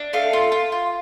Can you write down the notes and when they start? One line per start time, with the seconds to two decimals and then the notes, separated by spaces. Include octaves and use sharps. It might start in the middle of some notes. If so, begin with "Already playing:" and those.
Already playing: D4
0.13 A3 F5
0.33 F4
0.52 F4
0.72 F4